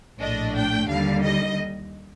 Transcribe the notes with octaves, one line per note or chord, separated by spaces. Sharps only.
A#1 A2 A3 D4 D#5
G5
D#2 D3 G3 F5
D#5